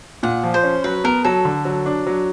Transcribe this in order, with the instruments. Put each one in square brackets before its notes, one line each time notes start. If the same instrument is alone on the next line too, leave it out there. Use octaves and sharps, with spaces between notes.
[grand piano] A#2 [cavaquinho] F#5
[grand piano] F3
[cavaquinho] C5
[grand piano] C#4
[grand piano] F#3 [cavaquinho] B4
[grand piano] B3 [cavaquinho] A#4
[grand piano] F#3 [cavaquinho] A4
[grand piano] D3
F#3
D4
F#3